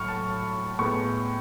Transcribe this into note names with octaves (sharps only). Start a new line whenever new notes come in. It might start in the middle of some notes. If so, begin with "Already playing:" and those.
Already playing: A2 F#3 A3 C#6 F6
A5
A2 G#3 B3 C#6